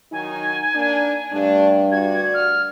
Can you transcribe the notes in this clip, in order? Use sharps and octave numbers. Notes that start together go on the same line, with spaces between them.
D#3 F#3 D#4 G#5
A#3 D4
G2 A3 D4
D2 F#4 D5 G#6
F6